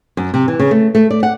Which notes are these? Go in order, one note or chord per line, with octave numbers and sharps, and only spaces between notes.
F#2
C3
E3
C#3
A3
A3
D5
F#5